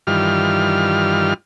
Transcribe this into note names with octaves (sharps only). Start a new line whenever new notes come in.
G2 D#3 E3 G3 F4 F6